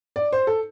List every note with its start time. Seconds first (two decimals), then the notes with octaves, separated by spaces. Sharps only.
0.16 D5
0.33 C5
0.47 A4